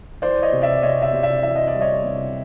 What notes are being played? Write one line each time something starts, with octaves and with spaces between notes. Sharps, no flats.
E3 C5 D5
C#5 D#5
C3
D5 E5
C3 C#5 D#5
D5 E5
C3
D5 E5
E3 E5
D#5
D5
G3
C#5 D#5
C3